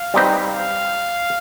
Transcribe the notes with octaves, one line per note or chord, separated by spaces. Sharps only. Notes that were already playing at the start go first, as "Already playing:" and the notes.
Already playing: F5
G3 C4 D#4 G4 B4
F5